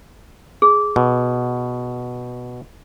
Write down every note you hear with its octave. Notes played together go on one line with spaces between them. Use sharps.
G#4
B2